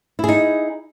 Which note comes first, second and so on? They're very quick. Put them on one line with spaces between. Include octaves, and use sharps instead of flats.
E4 G#4 D#4